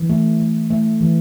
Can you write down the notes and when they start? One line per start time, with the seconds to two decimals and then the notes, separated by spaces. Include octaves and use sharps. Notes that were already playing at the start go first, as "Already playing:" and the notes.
Already playing: E3
0.10 A3
0.40 A3
0.70 A3
1.01 E3